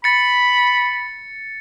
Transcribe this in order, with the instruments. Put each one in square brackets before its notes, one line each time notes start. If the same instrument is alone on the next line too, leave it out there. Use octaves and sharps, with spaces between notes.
[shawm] B5 [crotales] A6 C#7